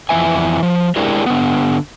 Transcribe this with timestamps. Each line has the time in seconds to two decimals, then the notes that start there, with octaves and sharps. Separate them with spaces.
0.09 F2 E3 B3 E5 G#5
0.63 F3
0.96 G#3 D4 E4 G4 G#4 A#4
1.26 D3 B3